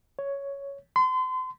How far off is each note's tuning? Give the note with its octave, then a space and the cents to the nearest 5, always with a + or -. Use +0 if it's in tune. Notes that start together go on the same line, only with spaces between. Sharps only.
C#5 +5
C6 -35